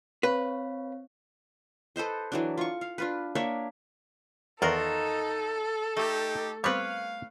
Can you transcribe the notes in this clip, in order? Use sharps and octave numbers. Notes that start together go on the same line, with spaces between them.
C4 B4 C#5 F5
A4 B4 C5 D#5
E3 F#3 D4
F4 C#6
F5
D4 F4 B4
A#3 D4 C#5 E5
E2 D#3 D#4 F4 F#4 A4 A#4
A3 D#4 G4
G3 B3 C4 B4 C#5 F5